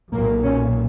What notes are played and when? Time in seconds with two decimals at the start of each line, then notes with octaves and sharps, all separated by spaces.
0.13 B1 A#2 A#3
0.44 C#4